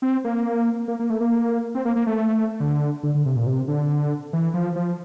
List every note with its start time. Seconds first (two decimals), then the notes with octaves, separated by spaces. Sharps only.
0.02 C4
0.24 A#3
0.88 A#3
0.99 A#3
1.10 A3
1.21 A#3
1.75 C4
1.85 A#3
1.96 A#3
2.07 A3
2.60 D3
3.03 D3
3.14 D3
3.26 C3
3.36 A#2
3.46 C3
3.68 D3
4.33 E3
4.54 F3
4.76 F3